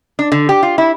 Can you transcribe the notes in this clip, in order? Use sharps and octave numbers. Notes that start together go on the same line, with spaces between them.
D4
D3
G4
F4
E4